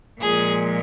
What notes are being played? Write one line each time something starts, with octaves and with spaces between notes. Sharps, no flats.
A#2 F3 G#3 G#4